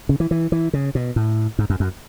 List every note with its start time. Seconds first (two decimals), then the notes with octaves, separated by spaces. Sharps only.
0.09 C#3
0.20 E3
0.31 E3
0.52 E3
0.73 C#3
0.95 B2
1.16 A2
1.59 G#2
1.70 F#2
1.80 F#2